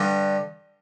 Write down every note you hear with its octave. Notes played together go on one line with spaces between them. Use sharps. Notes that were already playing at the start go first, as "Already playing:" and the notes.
Already playing: G2 D3 G3